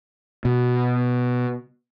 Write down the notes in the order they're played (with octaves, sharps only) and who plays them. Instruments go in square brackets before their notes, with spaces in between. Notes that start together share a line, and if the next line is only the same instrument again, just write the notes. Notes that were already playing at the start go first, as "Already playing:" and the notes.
[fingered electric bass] B2